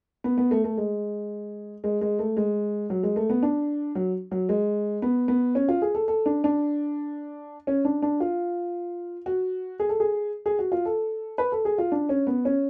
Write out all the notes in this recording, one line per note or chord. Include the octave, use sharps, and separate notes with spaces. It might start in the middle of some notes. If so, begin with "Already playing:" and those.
B3
B3
A3
A3
G#3
G#3
G#3
A3
G#3
F#3
G#3
A3
B3
D4
F#3
F#3
G#3
B3
B3
C#4
F4
G#4
A4
A4
D4
D4
C#4
D4
D4
F4
F#4
G#4
A4
G#4
G#4
F#4
F4
A4
B4
A4
G#4
F4
D4
C#4
B3
C#4